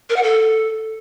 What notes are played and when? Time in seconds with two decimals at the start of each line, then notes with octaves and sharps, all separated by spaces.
0.10 A#4
0.16 F#5
0.23 A4